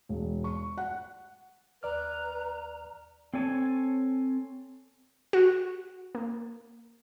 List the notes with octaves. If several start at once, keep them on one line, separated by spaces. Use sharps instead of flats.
E1
C#6
F#5
D#2 B4 D5 A#5 F6
C4 A4 C#5 G#5 A5
F#4
A#3